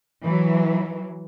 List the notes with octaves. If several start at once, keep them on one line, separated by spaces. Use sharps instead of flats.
E3 F#3